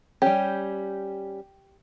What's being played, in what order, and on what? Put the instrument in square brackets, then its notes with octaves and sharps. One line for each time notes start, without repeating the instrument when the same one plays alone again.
[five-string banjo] G3 C#4 G4